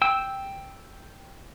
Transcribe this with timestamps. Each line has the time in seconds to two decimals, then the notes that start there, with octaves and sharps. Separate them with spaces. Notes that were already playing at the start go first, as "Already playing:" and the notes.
0.02 G5 E6